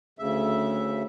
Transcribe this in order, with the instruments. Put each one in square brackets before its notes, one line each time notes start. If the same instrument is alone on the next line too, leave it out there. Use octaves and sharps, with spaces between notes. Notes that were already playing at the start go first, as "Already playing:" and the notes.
[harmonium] D2 C#3 E5